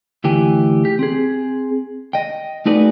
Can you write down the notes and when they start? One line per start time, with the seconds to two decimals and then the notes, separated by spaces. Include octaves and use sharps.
0.24 D2 E3 G4 G#5
0.85 G4
0.99 C4 G#4
2.13 D#5 G5
2.66 A3 D#4 F#4 G#4 B4 D5